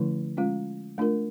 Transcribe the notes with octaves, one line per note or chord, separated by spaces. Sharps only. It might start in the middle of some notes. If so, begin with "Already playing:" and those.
Already playing: D3 F3 A3 C#4 E4
G#3 C#4 F4
A3 D4 F4 A#4